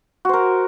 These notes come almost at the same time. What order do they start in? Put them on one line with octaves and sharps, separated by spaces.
F#4 C5 A#4